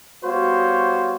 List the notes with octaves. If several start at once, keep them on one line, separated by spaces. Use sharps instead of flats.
G3 B3 F#4 C5 C#5 F5